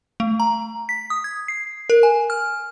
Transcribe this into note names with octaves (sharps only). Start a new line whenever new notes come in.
A3
A#5
B6
D#6
G#6
C7
A#4
G#5
F6